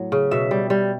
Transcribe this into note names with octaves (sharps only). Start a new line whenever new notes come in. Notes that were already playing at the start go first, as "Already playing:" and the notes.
Already playing: A2 F#3
C#3
B2 E5
G3
G3